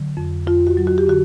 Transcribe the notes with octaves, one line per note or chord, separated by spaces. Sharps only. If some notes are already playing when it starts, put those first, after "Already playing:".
Already playing: D3 F#3
F2
F2 F4
F#4
F#3
F#4
G4
D3 F#4